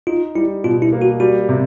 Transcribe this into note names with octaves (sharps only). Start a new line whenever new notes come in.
D#4 F4
G3 E4
B2 F4
E4
A#3
F#4
G3 F#4
C3